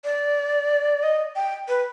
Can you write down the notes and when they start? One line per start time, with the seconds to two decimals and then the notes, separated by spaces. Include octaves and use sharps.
0.04 D5
1.03 D#5
1.36 G5
1.68 B4